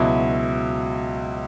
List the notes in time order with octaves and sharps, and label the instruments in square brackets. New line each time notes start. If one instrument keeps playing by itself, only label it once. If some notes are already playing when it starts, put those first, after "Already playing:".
Already playing: [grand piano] C#2 B2 F#3 E4